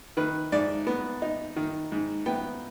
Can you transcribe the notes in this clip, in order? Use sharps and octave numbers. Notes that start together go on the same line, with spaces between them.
D#3 B4
G#2 D5
B3
D#4
D#3
G#2
B3 G5